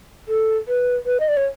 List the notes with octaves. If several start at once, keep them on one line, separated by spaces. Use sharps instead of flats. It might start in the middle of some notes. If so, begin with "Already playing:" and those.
A4
B4
B4
D#5
D5
C#5